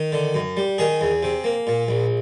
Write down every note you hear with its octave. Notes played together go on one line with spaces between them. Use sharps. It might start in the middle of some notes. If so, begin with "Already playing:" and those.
Already playing: D#3
D3
F#2
G3
D#3 G#4
E2
C3
A#3
A#2
A#1